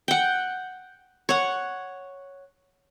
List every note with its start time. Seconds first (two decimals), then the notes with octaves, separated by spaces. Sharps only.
0.08 F#5 G5
1.29 C#5 F#5